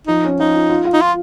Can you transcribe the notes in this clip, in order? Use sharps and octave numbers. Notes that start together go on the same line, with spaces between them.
F3 D#4
C#4
F3 D#4
F4
F4
F4
D#4
F4